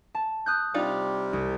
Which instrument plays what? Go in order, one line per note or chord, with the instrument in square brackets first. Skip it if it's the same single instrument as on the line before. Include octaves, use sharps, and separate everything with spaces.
[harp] A5
D#6 F#6 G6
[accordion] C3 G3 [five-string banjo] D4 D#4 F4
[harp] C2